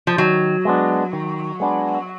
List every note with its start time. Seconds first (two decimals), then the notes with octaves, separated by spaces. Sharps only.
0.07 F3
0.18 D#3 F#3
0.65 G#3 B3 D4
1.13 D#3
1.60 G#3 B3 D4